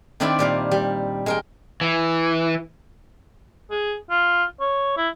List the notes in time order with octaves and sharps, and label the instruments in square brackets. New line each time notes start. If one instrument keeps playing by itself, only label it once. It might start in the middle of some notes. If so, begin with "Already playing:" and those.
[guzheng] D#3 C4 D4 E4 B4 D5
A#2 G3 F5
G3
G#3 A#4 G5
[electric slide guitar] E3
[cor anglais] G#4
F4
C#5
E4